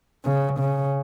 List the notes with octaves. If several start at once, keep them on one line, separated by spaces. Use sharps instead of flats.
C#3
C#3